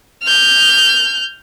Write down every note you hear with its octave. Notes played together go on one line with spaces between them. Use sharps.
F6 G6